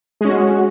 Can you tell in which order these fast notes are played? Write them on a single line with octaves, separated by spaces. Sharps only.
G#3 C#4 F#4